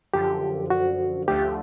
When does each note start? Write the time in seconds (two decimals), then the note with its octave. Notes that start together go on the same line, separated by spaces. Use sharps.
0.14 F#2 D3 F3 G4
0.70 F#4
1.28 D2 D3 F3 A3 G4